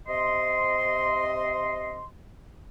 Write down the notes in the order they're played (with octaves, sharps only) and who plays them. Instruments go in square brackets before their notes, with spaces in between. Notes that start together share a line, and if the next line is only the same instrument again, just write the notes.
[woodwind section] C3 D#5 C6